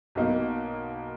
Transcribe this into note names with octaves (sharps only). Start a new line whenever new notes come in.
B1 B2 A#3 D#4